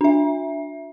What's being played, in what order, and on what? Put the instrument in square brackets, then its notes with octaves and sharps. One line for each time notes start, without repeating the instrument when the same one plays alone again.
[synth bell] D4 E5